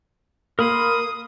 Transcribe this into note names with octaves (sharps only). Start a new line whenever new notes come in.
A#3 A#4 B5 C6 D#6